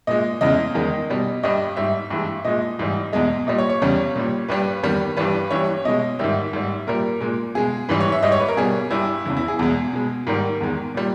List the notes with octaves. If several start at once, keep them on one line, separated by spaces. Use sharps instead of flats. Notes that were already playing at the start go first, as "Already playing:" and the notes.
A#2 G#3 D#5
E2 C#3 E3 G#3 D#5
E2 D#3 G#3
B2 G3
G2 G3 D#5
G#2 G3 E5
G2 E3 G#3
A#2 G#3 D#5
G#2 E3 G3
E2 B2 G#3 D#5
A#2 G3 D#5
C#5
C#5
E2 C#3 G3
A#2 G3
G2 G3 B4
E2 D#3 G3
G2 E3 G3 B4
G2 E3 G3 C#5
B2 G#3 D#5
G#2 D#3 G3 E5
G#2 G3
A#2 G3 A#4
A#2 G#3
B2 G#3 G#4
G#2 E3 G3 B4
C#5
E5
G#2 G3 D#5
C#5
B4
A#4
B2 G3 G#4
G2 G3 E4
E2 C#3 E3
E4
G#4
E2 B2 G#3
B2 G#3
G#2 D#3 G3 A#4
E2 D#3 G#3
A#2 G3